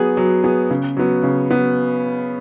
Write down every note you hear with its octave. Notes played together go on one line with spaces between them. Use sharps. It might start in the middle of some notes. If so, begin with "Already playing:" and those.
Already playing: F#3 B3 G#4
F#3
B3 G#4
C#3
F#3 B3
C#3
F#3 B3